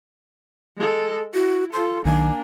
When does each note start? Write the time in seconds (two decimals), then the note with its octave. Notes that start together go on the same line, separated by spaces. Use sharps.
0.77 G#3 A4
1.34 E4 F#4
1.73 F4 A4 C6
2.05 B1 D#3 A#3 D4 G#5